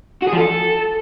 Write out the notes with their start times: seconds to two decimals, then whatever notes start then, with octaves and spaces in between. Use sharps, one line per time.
0.22 F#4
0.28 G#4
0.33 F3
0.38 A4